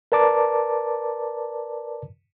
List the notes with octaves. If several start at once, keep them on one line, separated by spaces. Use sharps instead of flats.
A#4 B4 D5 A5 A#5 D6